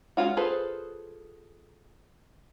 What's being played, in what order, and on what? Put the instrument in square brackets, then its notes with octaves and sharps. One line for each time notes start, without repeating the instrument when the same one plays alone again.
[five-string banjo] G#3 A#3 C#4 F4 F#4
F4 G#4 A4 B4 C5